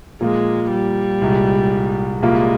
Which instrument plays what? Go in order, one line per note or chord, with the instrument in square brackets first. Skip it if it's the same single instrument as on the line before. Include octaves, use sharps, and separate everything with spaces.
[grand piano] A#2 F3 A#3 F4 [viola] G#3
[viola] G3
[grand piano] C2 A#2 G#3
[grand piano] C2 A#2 G3 A#3 F4 [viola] G#3